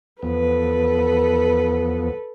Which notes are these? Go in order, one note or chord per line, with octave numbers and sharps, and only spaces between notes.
E2 F3 B3 A4 B4